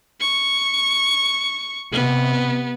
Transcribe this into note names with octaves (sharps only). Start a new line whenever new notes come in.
C#6
C3 B3